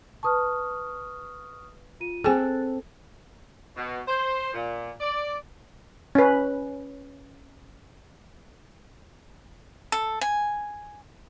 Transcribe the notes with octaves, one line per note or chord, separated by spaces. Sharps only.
B4 A5 C#6 D#6 F6
F4 D#7
C4 G#4 A4 G5 G#5 F#6 A6
B2
C5
A#2
D5
C#4 B4
A4
G#5